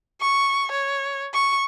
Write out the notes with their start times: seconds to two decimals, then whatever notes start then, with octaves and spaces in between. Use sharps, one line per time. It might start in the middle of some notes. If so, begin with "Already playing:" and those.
0.21 C#6
0.72 C#5
1.34 C#6